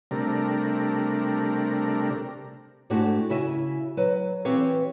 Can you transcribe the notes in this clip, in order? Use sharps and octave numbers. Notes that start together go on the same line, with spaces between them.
C3 G3 A3 D4 A#4
G#2 A3 D4 E4 F#4 G4
C#3 E4 F#4 E5 G#5
F#3 B4
E3 C4 G4 B4 C#5 F5